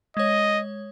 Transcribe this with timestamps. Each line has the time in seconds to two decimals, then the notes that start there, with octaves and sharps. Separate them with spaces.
0.17 G#3 C#5 D#5